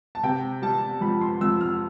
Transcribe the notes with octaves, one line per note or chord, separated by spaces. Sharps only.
A5
C3 G5
G3 A5
F2 B5
C6
F2 E6
F6